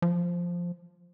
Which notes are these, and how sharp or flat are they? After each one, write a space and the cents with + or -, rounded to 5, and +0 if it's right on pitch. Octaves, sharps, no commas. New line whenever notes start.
F3 +0